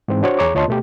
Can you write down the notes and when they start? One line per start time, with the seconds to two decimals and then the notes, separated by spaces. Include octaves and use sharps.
0.08 G#2 E3 C4
0.23 D4 F#4 C5 C#5
0.39 E2 G#4 C#5 A#5 D6
0.55 D2 F4 C#5 D#5 A5 C6
0.68 B2 A3 G4